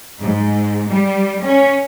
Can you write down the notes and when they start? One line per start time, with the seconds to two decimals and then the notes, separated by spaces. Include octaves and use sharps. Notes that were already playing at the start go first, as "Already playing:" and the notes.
0.20 G#2
0.90 G3
1.43 C#4